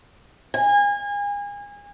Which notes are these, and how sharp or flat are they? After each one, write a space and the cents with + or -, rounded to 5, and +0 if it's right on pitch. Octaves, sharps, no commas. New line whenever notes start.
G#5 -30